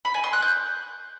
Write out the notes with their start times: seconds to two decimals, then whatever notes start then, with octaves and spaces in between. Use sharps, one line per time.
0.05 B5
0.14 G#5
0.24 C6
0.33 F#6
0.42 G6